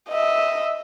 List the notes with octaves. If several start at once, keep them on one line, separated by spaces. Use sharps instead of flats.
D#5 E5